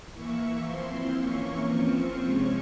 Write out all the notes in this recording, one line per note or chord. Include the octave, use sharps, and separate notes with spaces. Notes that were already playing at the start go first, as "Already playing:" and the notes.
E3 A#3 E4 C#6
F3 C4 E4 C6
E3 A#3 C#4 C#6
F3 C4 F4 C#6
C3 F3 G#3 C#4 C#6